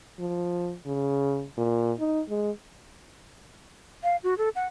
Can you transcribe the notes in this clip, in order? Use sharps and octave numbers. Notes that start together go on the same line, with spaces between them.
F3
C#3
A#2
D#4
G#3
F5
F#4
A4
F#5